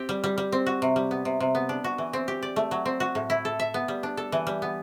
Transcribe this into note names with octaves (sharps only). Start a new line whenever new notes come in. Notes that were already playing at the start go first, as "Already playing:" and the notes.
Already playing: C4 G4
G3
G3
G3
C4
F#4
C3
G3
B3
C3
C3
B3
D4
F#4
E3
C4
G4
D5
A3
F#3
C4
F#4
A2
E4
A4
E5
B3
G3
D4
A4
E3
G3
B3